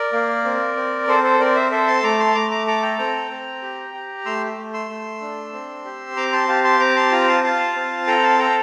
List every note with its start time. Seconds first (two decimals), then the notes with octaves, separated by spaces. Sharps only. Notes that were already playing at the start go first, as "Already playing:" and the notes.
Already playing: A#4 D5
0.13 A#3
0.45 C4
0.76 C4
1.08 C4 A4 C5
1.24 A4 C5
1.39 C4 A#4 D5
1.56 C5 E5
1.71 A4 C5 E5
1.87 A5 C6
2.03 A3 A#5 D6
2.19 A5 C6
2.35 A3 A#5 D6
2.51 A#5 D6
2.67 A4 A#5 D6
2.82 G5 A#5
2.98 C4 G5 A#5
3.31 C4
3.62 G4
3.94 G4
4.26 A3 C6 E6
4.57 A3
4.73 C6 E6
4.89 A3
5.21 D4
5.53 C4
5.85 G4
6.16 C4 A#5 D6
6.32 A5 C6
6.48 G4 F5 A5
6.64 A5 C6
6.80 C4 A#5 D6
6.96 A5 C6
7.12 F4 G5 A#5
7.28 F5 A5
7.44 F4 F5 A5
7.75 C4
8.07 A4 G5 A#5
8.23 F5 A5
8.39 A4 G5 A#5